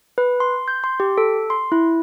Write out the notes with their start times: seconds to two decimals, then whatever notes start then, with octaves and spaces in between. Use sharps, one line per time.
0.18 B4
0.40 C6
0.68 G6
0.84 C6
1.00 G4
1.18 A4
1.50 C6
1.72 E4